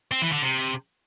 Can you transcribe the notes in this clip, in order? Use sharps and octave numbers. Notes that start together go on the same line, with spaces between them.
C4
E3
D3
C3